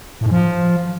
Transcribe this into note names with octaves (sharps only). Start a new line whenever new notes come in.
A2
G#2
F3